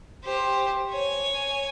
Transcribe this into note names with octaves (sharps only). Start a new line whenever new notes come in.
G4 C5
C#5 G#5